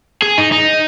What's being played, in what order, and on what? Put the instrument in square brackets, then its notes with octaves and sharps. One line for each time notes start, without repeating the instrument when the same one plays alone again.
[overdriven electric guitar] G#4
D#4
D#4